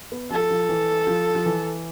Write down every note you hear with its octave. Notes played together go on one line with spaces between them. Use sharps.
B3
F3 A4
F3
E3
F3
F3
E3